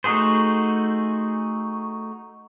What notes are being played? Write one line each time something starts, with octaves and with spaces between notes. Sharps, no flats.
A3 D#4 F#4 G#4 C5